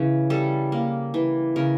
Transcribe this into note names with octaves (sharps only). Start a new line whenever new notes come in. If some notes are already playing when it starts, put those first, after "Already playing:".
Already playing: C#3 E3
G3 A4
A#3
E3
C#3 A#4